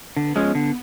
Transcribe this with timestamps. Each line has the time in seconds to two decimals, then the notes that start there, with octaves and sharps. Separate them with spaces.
0.17 D3 B3
0.36 F3 G#3 C#4
0.55 D3